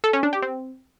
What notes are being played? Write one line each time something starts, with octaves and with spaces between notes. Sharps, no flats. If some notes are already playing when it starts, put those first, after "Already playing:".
A4
C#4
D4
G4
C4